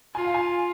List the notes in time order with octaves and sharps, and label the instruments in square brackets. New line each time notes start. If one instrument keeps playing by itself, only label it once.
[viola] F4 [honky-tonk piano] G#5
[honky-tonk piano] F5
G#5